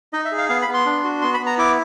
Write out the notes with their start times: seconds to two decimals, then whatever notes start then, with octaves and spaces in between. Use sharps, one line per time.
0.13 D#4 D#5
0.25 E5
0.32 G#4
0.38 F5
0.49 B3 F5
0.62 B5
0.68 B3
0.74 C6
0.86 D4
1.04 F#4
1.22 B3 C6
1.34 B5
1.40 B3
1.46 A#5
1.58 E4 D6